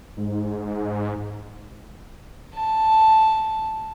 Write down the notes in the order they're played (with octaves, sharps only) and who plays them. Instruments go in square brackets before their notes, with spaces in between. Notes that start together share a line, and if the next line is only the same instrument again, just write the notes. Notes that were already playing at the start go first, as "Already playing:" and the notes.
[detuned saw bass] G#2
[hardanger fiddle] A5